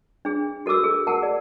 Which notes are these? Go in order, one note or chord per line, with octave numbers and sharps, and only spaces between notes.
D4 G#4
F#4 A4 A#4 D6 E6
G#4
G#4 A#4 F#5 A5
D5